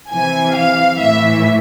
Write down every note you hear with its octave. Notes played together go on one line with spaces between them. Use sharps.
C3 E3 G#5
F5
A2 E3 E5